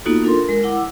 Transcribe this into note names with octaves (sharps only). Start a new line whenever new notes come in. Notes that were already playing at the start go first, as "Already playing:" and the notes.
A#3 B3 D#4 F4 F#4 A4
D4 F4 A4 A#4 C6
A#4
G#3 A#4
E4 F#5 D6
E6